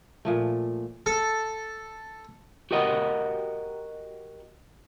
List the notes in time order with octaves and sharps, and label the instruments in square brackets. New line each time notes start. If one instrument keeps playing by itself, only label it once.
[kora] A#2 F3 A3
[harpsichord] A4
[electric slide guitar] F#4 G4 A#4 D#5 F#5